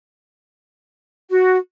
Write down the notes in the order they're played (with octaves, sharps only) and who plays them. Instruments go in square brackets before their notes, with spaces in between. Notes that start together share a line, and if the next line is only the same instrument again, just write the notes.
[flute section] F#4